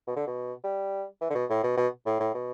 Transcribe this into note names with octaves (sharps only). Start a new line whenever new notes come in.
B2
D3
B2
G3
E3
D3
B2
A2
B2
B2
A2
A2
B2